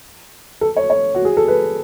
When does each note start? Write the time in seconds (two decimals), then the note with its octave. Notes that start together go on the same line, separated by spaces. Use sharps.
0.61 A4
0.76 C#5
0.90 C#5
1.15 F#4
1.25 G#4
1.37 A4
1.48 B4